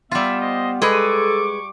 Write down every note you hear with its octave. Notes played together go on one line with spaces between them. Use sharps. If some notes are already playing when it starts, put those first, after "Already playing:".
G3 B3 F4 E5
C5 D#5
G#3 G#4 A4 B4 C#6 D6